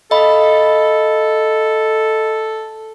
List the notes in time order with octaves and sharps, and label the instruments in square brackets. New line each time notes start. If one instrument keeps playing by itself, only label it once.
[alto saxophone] A4 [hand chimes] D#5 F5 B5